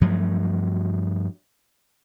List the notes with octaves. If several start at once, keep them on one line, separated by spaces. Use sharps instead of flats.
G2 F3 F#3 A3